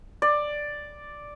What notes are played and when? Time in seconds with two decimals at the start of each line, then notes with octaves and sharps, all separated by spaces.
0.22 D5